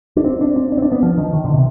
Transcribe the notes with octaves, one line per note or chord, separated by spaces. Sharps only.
D4
C4
D4
C4
D4
C4
D4
B3
F3
D#3
D#3
D3
C3